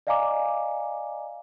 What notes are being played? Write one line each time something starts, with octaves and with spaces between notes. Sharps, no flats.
D5 D#5 F5 G#5 A#5 D6